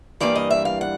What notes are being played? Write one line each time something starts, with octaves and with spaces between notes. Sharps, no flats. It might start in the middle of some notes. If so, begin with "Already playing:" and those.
G2 E3 G3 A#3 D5
D#5
E5
F5
F#5